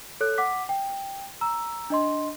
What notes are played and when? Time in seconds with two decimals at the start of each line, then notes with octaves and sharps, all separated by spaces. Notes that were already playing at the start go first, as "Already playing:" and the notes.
0.21 A4 C#5 F#6
0.38 F#5 D6 B6
0.69 G5
1.41 A#5 E6
1.90 D4 D#5 C6